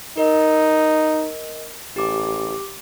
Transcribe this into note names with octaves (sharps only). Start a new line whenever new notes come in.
D#4 A#4 D#5
A1 G4 D6